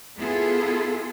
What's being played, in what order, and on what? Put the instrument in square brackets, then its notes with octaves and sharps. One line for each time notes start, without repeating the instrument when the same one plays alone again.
[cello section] B3 E4 F4 G#4 A4